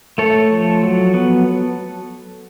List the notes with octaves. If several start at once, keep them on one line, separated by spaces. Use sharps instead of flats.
A3 A4 C#5
F3
F#3
B3